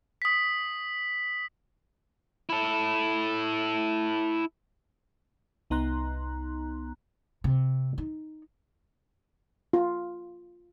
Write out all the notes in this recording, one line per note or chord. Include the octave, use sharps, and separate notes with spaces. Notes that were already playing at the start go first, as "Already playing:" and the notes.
D#6 B6
E4 A4
C2 B3 D#4 A#5 C6 F#6
C3
D#4
F4